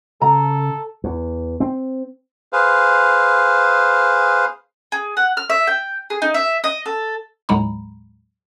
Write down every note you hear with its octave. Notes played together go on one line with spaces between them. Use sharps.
C#3 A4 A#5
E2
C4
G#4 B4 C5 F5
G#4
F#5
F6
E5
G5
G#4
D#4
E5
D#5
A4
D#2 A2 F#3 G#3 A#5 B5